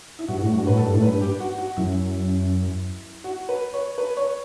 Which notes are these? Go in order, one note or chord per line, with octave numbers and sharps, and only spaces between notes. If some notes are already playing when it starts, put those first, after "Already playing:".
E4
G2 F#4
A2
G2 F#4
A2 B4
G2 A4
A2
G2 B4
G4
F#4
F#4
F#2 E4
F#4
B4
C#5
B4
C#5